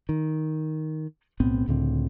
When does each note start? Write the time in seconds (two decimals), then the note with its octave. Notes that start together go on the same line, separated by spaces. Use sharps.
0.09 D#3
1.40 B1 A2 B3 C4
1.68 C#2 A2 D3 C4